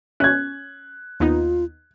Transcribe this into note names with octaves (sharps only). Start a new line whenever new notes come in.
C#4 F#6 G#6
D#2 B3 D#4 F4